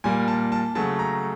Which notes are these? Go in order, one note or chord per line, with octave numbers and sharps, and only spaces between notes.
A#2 G3 A#3 G#5
A5
A5
C#3 F#3 A3 A5
A#5